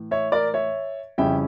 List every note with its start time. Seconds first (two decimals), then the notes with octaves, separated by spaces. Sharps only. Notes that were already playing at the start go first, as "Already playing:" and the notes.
Already playing: A2 E3
0.11 C#5 E5
0.32 A#4 D5
0.54 C#5 E5
1.18 F2 C#3 G3 C#4 E4 E5 G5